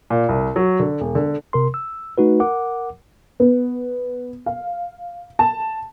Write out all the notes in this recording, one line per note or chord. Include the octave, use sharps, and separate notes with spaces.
A#2
C2
F#3
D3
E1
D3
C3 A#4 C6
E6
A3 D#4 F#4 B4
A#4 F#5 D6
B3
F5
A5